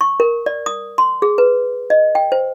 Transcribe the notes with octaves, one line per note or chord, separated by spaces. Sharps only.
C#6
A#4
D5
D#6
C6
G#4
B4
D#5
G5
C5